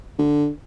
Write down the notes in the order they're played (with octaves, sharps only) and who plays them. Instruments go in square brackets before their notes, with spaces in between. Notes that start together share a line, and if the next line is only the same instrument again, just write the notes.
[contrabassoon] D3